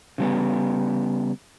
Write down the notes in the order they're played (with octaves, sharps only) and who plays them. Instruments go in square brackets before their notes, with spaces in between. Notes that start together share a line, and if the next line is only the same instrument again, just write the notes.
[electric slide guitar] C#3 G3 B3